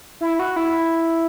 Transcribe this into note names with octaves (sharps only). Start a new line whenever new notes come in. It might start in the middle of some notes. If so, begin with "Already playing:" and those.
E4
F#4
E4